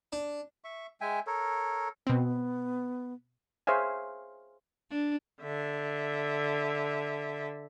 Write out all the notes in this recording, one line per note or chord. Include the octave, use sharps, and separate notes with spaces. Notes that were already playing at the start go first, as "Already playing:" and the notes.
D4
E5 C#6
G#3 E5 G5 G#5
A4 A#4 C#5
B2 B3 C4
G#4 C5 C#5 E5 F5 G#5
D4
D3 E5